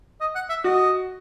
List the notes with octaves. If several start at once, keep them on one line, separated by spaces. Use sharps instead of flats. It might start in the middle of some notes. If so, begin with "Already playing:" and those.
D#5
F#5
E5
F#4 D#5